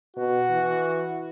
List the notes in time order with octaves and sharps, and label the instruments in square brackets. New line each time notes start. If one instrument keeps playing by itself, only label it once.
[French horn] B2 [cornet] F#4
[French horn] E3